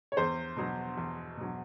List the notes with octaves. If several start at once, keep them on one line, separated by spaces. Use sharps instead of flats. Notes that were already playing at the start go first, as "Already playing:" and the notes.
C#5
E2 C5
B2 F#3
E2
B2 F#3